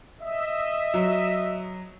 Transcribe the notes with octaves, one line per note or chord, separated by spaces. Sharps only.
D#5 E5
F#3